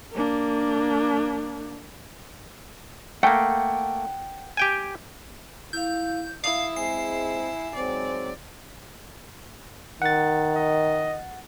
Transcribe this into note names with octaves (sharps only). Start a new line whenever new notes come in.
A#3 D4
A3 A#3 F#5 G5
G4 G5 G#5
E4 F5 G6
E4 F5 D#6
G#3 C4 G#5 C7
G#2 F#3 C4 D5
D#3 F#5 A6
D#5